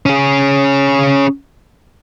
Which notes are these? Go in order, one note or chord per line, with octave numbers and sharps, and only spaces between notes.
C#4 G#4